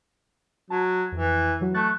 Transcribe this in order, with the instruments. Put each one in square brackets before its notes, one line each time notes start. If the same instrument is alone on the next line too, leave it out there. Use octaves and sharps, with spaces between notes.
[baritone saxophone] F#3 [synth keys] A5
[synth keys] F2 [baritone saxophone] E3
[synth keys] E3 F#3 F#4
[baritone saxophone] A3 [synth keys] C#6 F#6 A6